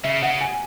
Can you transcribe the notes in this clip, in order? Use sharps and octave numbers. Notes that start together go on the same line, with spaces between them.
C#3 E5
C#3 F#5
G#5